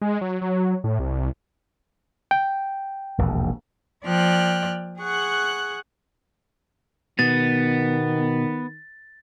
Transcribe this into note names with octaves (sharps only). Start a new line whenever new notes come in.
G#3
F#3
F#3
A2
C2
G5
E1 A#1 D#2
F3 A#3 D5 G5 F6 F#6
G#4 F#5 C#6 F#6
B2 D#3 B3 A6